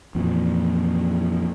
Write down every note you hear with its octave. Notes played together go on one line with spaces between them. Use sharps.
F2 A#2 E3